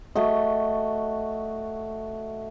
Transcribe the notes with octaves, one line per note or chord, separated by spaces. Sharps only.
A3 F#4 D#5